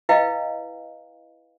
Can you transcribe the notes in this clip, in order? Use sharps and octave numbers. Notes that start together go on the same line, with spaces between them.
E4 B4 D#5 F5 G5